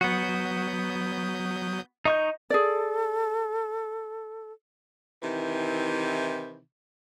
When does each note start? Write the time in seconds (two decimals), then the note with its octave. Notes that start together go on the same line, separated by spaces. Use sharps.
0.01 F#3 B3 F#4 D#6 G6
2.05 D#4 D#5 C#6 G6
2.50 G#4 A4 D5
5.23 C3 D#3 E3